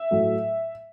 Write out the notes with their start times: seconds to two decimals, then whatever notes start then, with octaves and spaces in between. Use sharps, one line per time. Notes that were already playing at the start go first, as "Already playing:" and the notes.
Already playing: E5
0.11 A2 F#3 A3